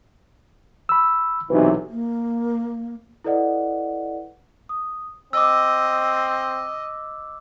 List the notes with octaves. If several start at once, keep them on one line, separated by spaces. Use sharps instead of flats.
B5 E6
B1 C3 E3 D#4 B4
A#3
E4 A4 B4 D5 D#5 F#5
D#6
C4 D#5 D6 E6